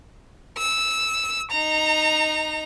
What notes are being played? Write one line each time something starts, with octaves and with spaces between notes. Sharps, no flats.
E6
D#4 A#5